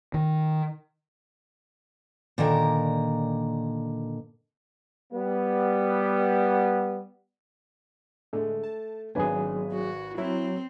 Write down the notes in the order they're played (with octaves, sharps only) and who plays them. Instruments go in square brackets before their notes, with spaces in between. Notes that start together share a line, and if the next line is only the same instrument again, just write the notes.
[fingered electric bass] D#3
[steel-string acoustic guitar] A#2 D3 D#3 A#4
[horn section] G3 B3
[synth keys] A2 D3 G#3 [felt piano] A3
[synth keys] A5
[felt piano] G#1 B4 G#5 [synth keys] D#3 B3 D4 [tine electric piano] F#3 G#4
[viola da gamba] F#4
[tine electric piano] F#3 [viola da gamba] C4 [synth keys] E4 A#4